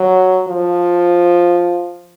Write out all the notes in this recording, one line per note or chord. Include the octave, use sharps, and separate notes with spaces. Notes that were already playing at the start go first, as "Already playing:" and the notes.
Already playing: F#3
F3